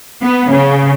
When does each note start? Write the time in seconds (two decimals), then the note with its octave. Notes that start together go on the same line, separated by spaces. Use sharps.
0.22 B3
0.51 C#3